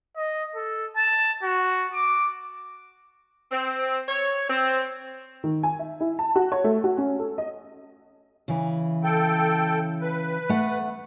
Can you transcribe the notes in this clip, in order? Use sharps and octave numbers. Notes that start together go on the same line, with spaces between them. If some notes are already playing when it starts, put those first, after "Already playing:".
D#5
A4
A5
F#4
D6
C4
C#5
C4
D#3
G#5
E5
E4
A5
F#4
C#5
A3
F#4
C#4
A4
D#5
C#3 E3
A4 G5
B4
A3 F#5